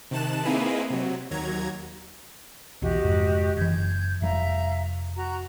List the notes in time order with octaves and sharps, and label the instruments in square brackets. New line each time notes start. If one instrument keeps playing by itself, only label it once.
[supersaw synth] C3 D#3 A5 F#6 E7
A#3 C4 D#4 E4 G#4 B4
C3 F#3
D#2 F#3 A#5 G#6
[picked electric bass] B1 E2 [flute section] F#4 G4 D#5
[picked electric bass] F1 G#2
[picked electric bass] F#1 E3 [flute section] G6 G#6
[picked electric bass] F1 G3 [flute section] E5 F5 A#5
[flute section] F#4 A#5